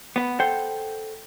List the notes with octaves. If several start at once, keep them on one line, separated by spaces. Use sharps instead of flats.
B3 B4
A4 C5 F#5 G5